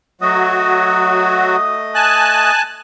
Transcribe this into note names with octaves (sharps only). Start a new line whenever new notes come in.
F#3 A3 F#4 D#5 D#6
G#5 A5 F#6